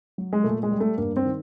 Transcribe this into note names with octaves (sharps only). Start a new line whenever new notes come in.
F#3
G#3
A#2 A3
G#3
G3
A3
G2 A#3
C4
D#3